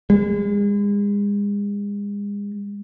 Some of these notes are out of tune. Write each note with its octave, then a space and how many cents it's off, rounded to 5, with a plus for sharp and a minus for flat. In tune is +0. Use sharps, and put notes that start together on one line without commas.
G#3 -35